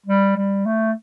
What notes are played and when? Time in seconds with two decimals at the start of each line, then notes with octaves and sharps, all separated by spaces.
0.06 G3
0.37 G3
0.66 A3